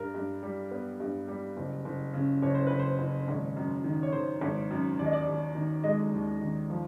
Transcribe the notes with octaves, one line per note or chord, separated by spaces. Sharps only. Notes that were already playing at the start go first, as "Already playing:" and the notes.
Already playing: G2 A#4
G2
G3
B3
G2
G3
F#1
F#1
C#3
F#1 C#5
C5
F#1 B4
C5
F#1
G#1
F#2
D#3
C#5
D#3 C5
G#1
F#2
D#2 D5
D#5
D5
D#2
D#3
G#3 D#5
D#2
D#3
F3